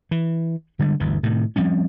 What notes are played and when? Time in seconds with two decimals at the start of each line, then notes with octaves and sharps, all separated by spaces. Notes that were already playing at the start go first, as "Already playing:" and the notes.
0.11 E3
0.79 D3 G3 G#3
1.00 G1 D2 E3
1.23 A2 C3 D#3
1.56 F3 G3 C4 C#4